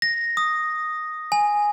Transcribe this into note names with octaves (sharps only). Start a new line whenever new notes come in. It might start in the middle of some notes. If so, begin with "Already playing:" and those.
A#6
D#6
G#5